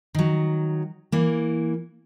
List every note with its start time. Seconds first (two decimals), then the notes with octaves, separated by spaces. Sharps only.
0.14 D#3 F#3
1.12 E3 A#3